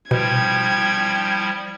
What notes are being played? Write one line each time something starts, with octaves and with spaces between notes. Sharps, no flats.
B2 F3 G3 E4 G5 G#6